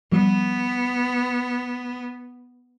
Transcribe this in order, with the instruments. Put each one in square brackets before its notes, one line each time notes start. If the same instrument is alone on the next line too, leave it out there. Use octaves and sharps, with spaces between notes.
[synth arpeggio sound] F3 G3 [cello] B3